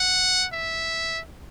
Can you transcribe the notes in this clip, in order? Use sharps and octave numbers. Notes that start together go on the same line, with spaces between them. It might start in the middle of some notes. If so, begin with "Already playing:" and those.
Already playing: F#5
E5